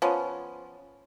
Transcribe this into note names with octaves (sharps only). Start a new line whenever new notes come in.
F3 B3 C#4